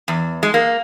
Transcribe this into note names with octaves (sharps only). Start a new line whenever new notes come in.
E2
G#3
A#3